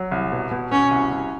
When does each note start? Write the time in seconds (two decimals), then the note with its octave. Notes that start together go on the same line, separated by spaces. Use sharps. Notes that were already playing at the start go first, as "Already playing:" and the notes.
Already playing: F#3
0.11 C2
0.32 B2
0.51 B2
0.71 B2 C#4
0.91 C2
1.11 C2